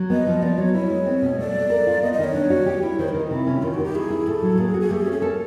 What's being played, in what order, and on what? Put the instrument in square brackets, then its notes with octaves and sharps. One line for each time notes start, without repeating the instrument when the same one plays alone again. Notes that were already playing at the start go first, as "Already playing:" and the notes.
Already playing: [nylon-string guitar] F#3
[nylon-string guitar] B3 [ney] D#5
[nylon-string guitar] F3
[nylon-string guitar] B3 [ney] D5
[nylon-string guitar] F#3 [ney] C#5
[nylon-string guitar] E4 [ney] C#5
[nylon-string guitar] G#3
C4
B2
[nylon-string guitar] A3 [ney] D5
[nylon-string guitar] A3
A#4
F4
[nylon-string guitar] B3 [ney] D#5
[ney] D#5
[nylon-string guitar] D#3
[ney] C#5
[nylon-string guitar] D4
F#4
G4
E4
[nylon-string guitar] D#3 [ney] C5
[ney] A#4
[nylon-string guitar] D#3
[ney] F4
D#4
[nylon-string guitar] C3 [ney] E4
[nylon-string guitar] C#4
[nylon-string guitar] D#3 [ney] F4
[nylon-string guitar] D#3 [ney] F#4
[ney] G4
[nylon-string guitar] E4 [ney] G#4
[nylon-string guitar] E4
[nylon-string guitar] A2 [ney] A4
[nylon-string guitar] F#3
[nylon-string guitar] A#3 [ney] G#4
[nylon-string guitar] F#4
[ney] G#4
[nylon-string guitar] A3 [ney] G4
[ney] G#4
[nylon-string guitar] C#4
[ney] G#4
[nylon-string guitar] A4 [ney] A#4